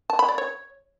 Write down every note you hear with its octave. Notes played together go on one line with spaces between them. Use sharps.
A5
B5
D5
C#5